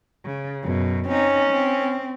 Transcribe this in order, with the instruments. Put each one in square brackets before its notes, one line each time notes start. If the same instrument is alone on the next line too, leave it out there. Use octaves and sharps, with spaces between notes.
[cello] C#3
F#2 B2
[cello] C4 D#4 [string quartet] C#4
[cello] C4